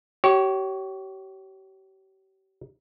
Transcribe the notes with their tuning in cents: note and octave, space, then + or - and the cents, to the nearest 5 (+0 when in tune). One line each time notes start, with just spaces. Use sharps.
G4 -40 C#5 +0